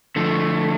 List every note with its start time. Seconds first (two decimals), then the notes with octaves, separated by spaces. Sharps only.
0.16 D3 F3 A3